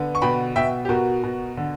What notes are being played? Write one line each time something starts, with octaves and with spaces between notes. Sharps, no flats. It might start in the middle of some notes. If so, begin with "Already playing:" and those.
Already playing: D3 B3
C#6
B2 G5 B5
B2 E5 G5
G4
B2 F#4 A#4
B2
D3